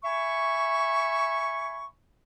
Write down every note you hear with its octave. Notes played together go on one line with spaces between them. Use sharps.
E5 G#5 B5 C#6